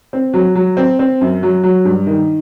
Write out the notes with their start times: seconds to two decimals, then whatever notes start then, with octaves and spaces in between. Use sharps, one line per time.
0.13 C4
0.34 F#3
0.55 F#3
0.77 C4
0.99 C4
1.21 F#2
1.43 F#3
1.63 F#3
1.85 G2
2.06 D#3